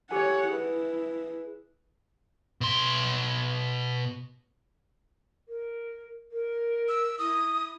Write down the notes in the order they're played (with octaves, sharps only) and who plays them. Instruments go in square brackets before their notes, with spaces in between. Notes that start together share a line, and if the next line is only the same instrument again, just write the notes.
[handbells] G4 A4 G#5 [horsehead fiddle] C#5 F#5
[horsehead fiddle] E4 [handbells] G#4 B4
[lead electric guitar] B2 C6
[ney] A#4
A#4
[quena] E6
[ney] E4 [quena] D#6